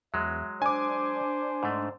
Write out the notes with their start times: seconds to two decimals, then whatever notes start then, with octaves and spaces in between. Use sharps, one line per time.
0.14 E2 F#3 G#3 E5
0.62 D4 C5 G#5 D6
1.63 G#2 A3